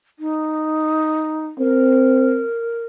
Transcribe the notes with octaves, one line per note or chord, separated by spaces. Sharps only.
D#4
C4 A#4